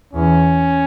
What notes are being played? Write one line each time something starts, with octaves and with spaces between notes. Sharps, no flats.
E2 C#4